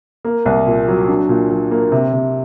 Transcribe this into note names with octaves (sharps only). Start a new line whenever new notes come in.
A#3
C2
A#2
F#3
D4
A#2
F#3
A#3
C3
C3